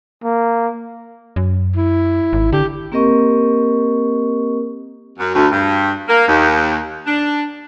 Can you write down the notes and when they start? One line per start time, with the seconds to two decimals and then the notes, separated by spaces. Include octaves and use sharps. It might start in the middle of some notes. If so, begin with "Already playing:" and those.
0.24 A#3
1.36 F#2
1.76 E4
2.33 G#1
2.52 D3 G4
2.92 A#3 C4 G4 A#4 D#5 C#6
5.19 F#2
5.35 D2
5.52 G2
6.08 A#3
6.28 D#2
7.06 D4